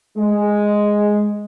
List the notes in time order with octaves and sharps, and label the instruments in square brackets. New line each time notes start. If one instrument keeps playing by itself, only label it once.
[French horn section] G#3